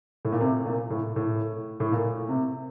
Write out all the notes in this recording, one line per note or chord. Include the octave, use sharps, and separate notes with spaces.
A2
A#2
C3
A#2
A2
A2
A2
A#2
C3